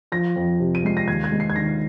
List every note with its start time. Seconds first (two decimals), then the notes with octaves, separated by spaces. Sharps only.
0.12 F3 A#6
0.36 F2
0.60 C3
0.75 D#7
0.84 G#3 C7
0.97 A#6
1.08 D#2 G#6
1.24 G#6
1.32 G#3
1.40 C7
1.50 G#6
1.56 D#3 A#6